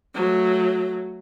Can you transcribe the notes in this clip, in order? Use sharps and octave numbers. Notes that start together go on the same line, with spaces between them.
F#3 A3